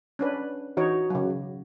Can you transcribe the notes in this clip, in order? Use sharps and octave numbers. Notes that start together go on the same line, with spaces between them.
C#4 D4 B4
E3 D#4 F#4 C#5
C#3 F#3